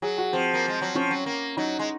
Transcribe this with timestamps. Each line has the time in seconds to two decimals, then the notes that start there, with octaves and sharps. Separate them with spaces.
0.02 F#3 G#4
0.18 F#4
0.33 F3 C4
0.54 A#3
0.68 G#3
0.82 F#3
0.95 F3 C#4
1.11 F#3
1.26 A#3
1.57 F#3 D#4
1.79 G#3